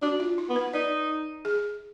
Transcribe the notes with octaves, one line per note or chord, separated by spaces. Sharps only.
D4 F#4
F4
D#4
B3
B4
D#4 D5
G#4